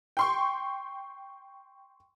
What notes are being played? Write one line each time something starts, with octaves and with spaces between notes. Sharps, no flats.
G5 C6 C#6